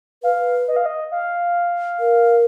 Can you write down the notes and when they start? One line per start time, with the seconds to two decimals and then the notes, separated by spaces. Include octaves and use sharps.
0.23 B4 F5
0.68 D#5
0.76 F5
0.86 D#5
1.12 F5
2.00 A#4